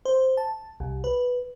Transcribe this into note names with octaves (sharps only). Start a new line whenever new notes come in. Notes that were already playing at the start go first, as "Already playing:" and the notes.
C5
A5
C2
B4